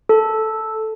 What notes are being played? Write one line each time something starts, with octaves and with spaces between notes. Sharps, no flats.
A4